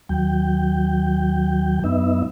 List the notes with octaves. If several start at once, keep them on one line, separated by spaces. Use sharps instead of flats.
D#2 F#3 G5
F#2 B3 D#4 E5